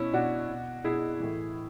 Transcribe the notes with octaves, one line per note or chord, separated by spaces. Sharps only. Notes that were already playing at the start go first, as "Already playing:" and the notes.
Already playing: B2 C#4 E4
B2 D4 F#4
B2
B2 E4 G#4
A2 E3